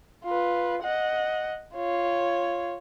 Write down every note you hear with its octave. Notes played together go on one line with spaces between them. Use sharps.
F4 B4
D#5 F#5
F4 C#5